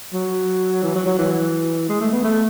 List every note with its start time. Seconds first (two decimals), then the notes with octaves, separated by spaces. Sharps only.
0.13 F#3
0.83 E3
0.95 F#3
1.06 F#3
1.19 E3
1.89 G#3
2.01 A3
2.12 B3
2.24 A3